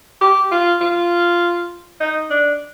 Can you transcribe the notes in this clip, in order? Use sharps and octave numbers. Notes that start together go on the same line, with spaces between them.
G4
F4
F4
D#4
D4